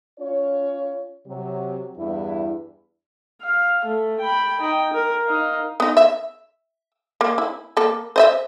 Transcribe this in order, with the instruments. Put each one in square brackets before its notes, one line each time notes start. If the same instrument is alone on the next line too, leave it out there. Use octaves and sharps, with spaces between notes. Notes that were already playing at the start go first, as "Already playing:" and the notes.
[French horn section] C#4 F4 C#5
C3 F#3
E2 G2 E4
[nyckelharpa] F5
A3
G5 B5
D#4 G5
A#4
D#4 F5
[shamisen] B3 D#4
E5
A#3
E4
A#3 A4
C5 D#5 E5